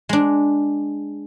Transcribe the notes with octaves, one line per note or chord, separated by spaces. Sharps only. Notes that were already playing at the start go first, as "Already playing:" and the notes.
G#3 D4